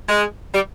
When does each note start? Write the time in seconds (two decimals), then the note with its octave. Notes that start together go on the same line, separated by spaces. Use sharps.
0.09 G#3
0.53 G3